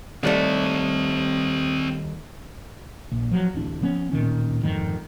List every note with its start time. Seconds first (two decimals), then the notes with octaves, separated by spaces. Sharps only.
0.23 D#2 G3 A3 C4 D5
3.12 A#1
3.31 F3 F#3
3.54 D1 A1 D4
3.82 F3 B3 C#4
4.12 D1 A#2 D#3 C#4
4.63 G1 F2 G#2 D#3